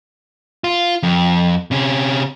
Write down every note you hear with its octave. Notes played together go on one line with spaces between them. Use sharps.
F4
F2
C3 C#4